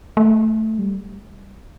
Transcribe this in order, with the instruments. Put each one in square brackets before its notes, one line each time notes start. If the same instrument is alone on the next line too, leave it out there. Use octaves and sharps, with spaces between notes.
[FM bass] A3
G3